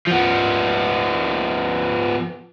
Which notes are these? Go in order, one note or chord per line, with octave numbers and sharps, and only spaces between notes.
F3 B3